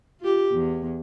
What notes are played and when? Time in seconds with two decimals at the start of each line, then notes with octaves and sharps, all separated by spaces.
0.20 F4 G4
0.51 E2